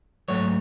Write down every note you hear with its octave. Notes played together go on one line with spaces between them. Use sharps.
G#2 F#3 A3 C#5